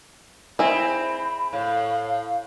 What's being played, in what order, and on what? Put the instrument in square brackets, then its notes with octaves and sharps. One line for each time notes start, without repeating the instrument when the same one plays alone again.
[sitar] C4 [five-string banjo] E4 G#4 [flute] B5
[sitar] A2 [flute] F5